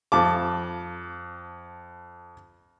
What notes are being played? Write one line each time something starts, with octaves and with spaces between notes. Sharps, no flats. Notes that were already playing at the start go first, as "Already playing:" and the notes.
F2 A5 D6